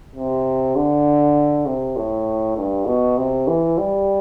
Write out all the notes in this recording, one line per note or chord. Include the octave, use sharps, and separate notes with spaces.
C3
D3
C3
A2
G2
B2
C3
E3
G3